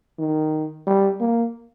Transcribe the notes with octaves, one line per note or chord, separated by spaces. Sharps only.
D#3
G3
A#3